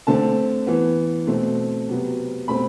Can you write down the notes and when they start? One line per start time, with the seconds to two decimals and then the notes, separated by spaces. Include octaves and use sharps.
0.07 D3 A3 C4 A5
0.67 E3 B3
1.27 B2 A3 C4
1.88 C3 F#3 B3
2.47 B2 A3 C4 B5